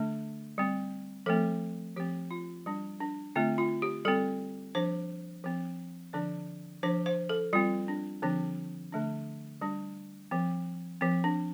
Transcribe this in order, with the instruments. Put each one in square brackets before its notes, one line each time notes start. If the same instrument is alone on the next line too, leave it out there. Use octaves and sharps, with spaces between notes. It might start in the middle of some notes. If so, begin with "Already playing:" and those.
Already playing: [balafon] D3 A3 D4
G3 C4
F3 A3 C4 A4
F3 C4 G4
F4
G3 D4
D4
D3 A3 C4 F4
F4
G4
G3 C4 A4
F3 D4 C5
F3 C4
D3 F3 D4 D5
F3 D4 C5
C5
A4
G3 C4 F4
D4
D3 F3 C4 D4
D3 A3 D4
G3 D4
F3 C4
F3 C4
D4